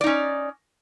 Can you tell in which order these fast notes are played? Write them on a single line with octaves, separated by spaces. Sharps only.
D5 D#4 C#4